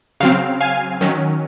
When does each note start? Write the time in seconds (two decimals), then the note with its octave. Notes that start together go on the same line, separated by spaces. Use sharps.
0.20 C#3 F#3 C4 F5
0.61 F5 G#5
1.01 D#3 F#3 C#4